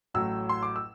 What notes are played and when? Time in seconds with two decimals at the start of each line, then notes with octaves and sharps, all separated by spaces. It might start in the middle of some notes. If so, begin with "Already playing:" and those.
0.14 A1 A2 F#3 E6
0.49 C6
0.63 D6
0.76 E6